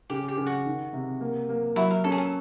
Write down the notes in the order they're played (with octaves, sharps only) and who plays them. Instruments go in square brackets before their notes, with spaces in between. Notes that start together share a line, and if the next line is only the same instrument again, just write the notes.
[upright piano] C#3 [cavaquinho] G4
[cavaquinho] G4
[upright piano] C#3
[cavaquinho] F#4
[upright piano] D#3
C3
A#3
A#3
[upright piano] F#3 [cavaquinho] E4
[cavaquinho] A#4
[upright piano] C#4 [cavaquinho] A4
[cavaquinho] G#4
A4